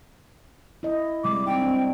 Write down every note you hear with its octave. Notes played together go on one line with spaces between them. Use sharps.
E4 D#5
C3 G3 G#3 D6
C4 D#4 G5
C4 D4